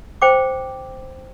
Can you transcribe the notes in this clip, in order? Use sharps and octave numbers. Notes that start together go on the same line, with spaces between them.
C5 G5 D6